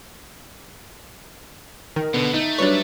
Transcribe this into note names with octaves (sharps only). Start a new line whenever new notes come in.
D#3 A#4
B2 D3 B3
A3 D#4
F#3 G3 D4 B4 C#5